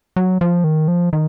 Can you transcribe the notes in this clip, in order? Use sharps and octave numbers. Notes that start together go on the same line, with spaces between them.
F#3
F3
D#3
F3
D#3